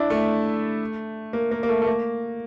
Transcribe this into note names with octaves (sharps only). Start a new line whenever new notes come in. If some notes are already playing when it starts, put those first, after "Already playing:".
Already playing: D4 E4
A3
A#3
A#3
A#3
A3
A3
A#3